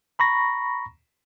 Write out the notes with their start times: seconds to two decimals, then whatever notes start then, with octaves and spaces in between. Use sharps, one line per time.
0.19 A#5 B5 C#6 A#6